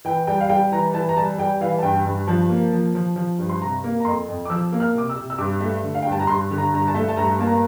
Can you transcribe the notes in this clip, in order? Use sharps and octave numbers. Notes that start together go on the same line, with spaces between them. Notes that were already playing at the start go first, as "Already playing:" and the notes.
E3 G5
G3 G5
F5
G3 G5
E3 A#5
E3 A5
A#5
G3 A5
G3 G5
E3 F5
A5
G2 G5
G2
F3 A5
A#3
F3
F3
F3
G2
C6
C3 A#5
A#3
A#5
F2 C6
F2
D6
F3 E6
A#3
F6
C3 D6
E6
C3
E6
G2 D6
A3
D3
F5
G5
G2
A5
A#5
G2 C6
D3
A#5
G2 A#5
A5
A3
A5
G2 A#5
A#3 A5
A#5